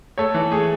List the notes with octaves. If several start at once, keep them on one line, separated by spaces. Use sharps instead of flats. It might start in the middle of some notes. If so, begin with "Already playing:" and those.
A3 A4 C#5
E3
A3 G#4